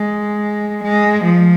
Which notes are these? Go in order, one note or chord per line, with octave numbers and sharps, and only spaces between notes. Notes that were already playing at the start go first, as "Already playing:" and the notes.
Already playing: G#3
G#3
F3